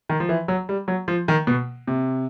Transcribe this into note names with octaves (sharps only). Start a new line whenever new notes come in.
D#3
F3
E3
F#3
G3
F#3
F3
D#3
B2
C3